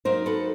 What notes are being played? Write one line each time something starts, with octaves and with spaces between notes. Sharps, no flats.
F#3 A#3 D#4 A#4 C5
A4 B4